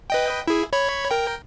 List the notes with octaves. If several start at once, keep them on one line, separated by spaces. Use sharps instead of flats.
B4 D#5 G5
E4 G#4
C#5 B5 G#6
A#4 G5